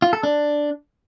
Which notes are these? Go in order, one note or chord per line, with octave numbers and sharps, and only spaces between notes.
F4
A4
D4